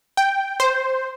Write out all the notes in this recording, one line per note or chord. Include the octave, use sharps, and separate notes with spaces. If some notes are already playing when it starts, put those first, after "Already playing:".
G5
C5